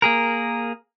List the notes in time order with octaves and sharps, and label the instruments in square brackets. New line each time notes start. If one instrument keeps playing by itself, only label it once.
[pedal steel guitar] A#3 G#4 A#4